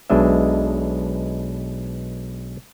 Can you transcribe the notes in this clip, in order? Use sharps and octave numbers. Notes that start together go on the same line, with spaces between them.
B1 B2 G#3 D4 D#5 E5